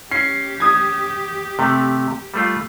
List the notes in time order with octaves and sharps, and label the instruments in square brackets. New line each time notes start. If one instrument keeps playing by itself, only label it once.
[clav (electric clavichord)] C#4 [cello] G4 [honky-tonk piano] C7
[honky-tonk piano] D#6 G#6
[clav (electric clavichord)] C3 A3
G3 A3 F4